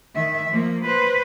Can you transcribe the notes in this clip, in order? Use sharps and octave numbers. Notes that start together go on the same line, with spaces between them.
D#3 E5
F3 A#3
B4 C5